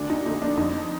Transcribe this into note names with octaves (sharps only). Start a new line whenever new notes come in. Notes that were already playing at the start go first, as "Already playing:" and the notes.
Already playing: D2 D4
D#4
D3 A3 D#4
D4
F2 D#4